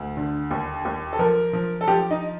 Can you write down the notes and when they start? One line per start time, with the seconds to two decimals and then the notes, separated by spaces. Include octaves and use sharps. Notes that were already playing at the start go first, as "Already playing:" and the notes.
Already playing: D2
0.17 D3
0.51 D#2
0.85 D#2
1.13 A4
1.19 F3 A#4
1.53 F3
1.81 A4
1.88 F3 G4
2.11 D#4